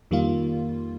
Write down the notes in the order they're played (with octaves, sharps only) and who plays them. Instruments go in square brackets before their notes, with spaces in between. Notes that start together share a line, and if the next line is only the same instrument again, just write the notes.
[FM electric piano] F2 D#3 G3 A#3 F4